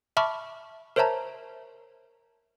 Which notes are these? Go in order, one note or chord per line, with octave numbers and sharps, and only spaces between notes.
E5 A5 B5 C#6 D6 F6
A#4 C5 C#5 E5 A5 A#5